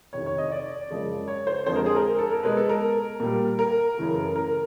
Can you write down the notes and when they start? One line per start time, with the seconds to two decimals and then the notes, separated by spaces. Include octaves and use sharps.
0.13 F2 C3 D#3 C#5
0.26 C#5
0.38 D#5
0.52 D5
0.90 F#2 C#3 F3 G#3
1.28 C#5
1.47 C5
1.66 F2 D3 F3 G#3 C5
1.76 A#4
1.86 G#4
1.96 A#4
2.18 A4
2.31 A#4
2.43 B2 G#3 B4
2.57 A4
2.69 A#4
3.20 A#2 G3
3.59 A#4
3.98 F#2 C#3 E3 A3
4.36 A#4